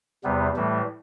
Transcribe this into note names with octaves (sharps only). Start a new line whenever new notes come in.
E2 C3 G3 B3
A2 E3 G3 A3